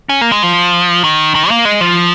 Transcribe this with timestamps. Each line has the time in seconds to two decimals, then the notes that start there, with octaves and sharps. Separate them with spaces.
0.09 C#4
0.21 A#3
0.32 G#3
0.43 F3
1.04 D#3
1.35 D#3
1.50 A#3
1.65 G#3
1.81 F3